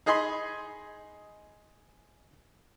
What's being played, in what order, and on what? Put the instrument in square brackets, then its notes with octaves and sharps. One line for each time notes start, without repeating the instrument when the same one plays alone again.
[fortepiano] D#4 G#4 D#5 G#5 B5 C6